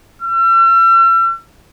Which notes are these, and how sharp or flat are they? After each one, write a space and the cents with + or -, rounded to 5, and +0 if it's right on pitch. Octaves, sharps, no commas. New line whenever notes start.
E6 +45